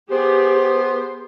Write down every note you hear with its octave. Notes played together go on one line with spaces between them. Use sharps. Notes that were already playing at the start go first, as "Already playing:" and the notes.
B3 G4 G#4 C5